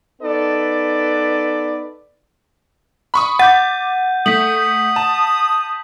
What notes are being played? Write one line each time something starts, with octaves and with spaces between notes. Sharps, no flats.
B3 D#4 A4 B4 D5
B5 C#6 D#6
F#5 D6 G6 A6 D#7
A3 D#6 B6 F#7
A5